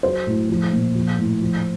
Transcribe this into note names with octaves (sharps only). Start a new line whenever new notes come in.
F#3 C5
A2
F3
A#2
F3
A2
F3